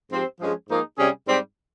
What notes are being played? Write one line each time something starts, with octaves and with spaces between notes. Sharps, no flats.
G#2 F3 C4 G4 C5
G2 F3 G#3 C#4 G#4
G#2 F3 A#3 D#4 G#4
C3 G3 C#4 G#4
G#2 G3 C4 G4